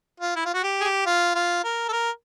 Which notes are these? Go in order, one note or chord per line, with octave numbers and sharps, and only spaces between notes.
F4
E4
F4
F#4
G4
G#4
G4
F4
F4
A#4
A4
A#4